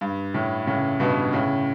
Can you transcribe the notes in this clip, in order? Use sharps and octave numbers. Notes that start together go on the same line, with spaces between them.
G2
A2
A2 C#3
G2 B2
A2 C#3